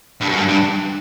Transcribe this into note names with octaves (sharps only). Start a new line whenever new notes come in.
G2
F#2
G2
G2